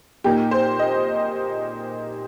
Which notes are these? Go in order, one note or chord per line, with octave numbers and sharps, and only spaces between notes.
A#2 A#3 D#4 G4
C5
D#5